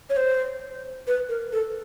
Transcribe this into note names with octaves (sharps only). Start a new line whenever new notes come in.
C#5
C5
B4
A#4
A4